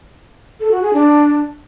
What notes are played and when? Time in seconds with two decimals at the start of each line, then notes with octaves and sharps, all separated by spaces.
0.60 A4
0.71 F#4
0.82 G#4
0.93 D4